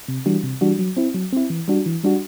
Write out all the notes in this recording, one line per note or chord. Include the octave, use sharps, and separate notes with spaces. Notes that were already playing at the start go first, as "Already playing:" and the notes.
C3
E3 G3 D4 F#4
C3
E3 G3 D4 F#4
F#3
C4 E4
F#3
C4 E4
E3
G3 D4 F#4
E3
G3 D4 F#4